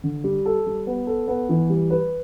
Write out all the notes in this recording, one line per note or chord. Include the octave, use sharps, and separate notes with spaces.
D3
G3
A4
G3
B3
A4
B3
E3
G3
B4